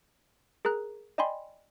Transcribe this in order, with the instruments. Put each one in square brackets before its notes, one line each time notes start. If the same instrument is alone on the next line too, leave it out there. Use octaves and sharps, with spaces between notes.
[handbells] G#4 A#4 A#5 F#6
D5 D#5 G5 G#5 B5 C6